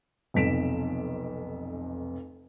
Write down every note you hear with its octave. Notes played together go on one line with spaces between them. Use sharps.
F1 B1 F2 B6 D7 E7